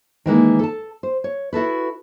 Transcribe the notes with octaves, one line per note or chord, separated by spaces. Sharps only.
D#3 E3 G#3 A#3
A4 A5
C5
C#5
E4 F#4 A4 B4